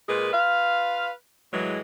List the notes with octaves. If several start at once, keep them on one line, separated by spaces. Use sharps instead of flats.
A#2 G#3 G#4 A#4 B4
F4 B4 F5
A2 E3 F#3 G#3